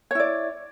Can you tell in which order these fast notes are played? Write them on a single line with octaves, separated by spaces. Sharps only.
C#5 E4 D5